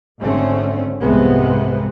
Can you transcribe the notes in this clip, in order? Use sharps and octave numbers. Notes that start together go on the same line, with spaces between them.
G#1 G#2 D3 A3 C4 C#4
C2 F2 G#2 C3 G#3 B3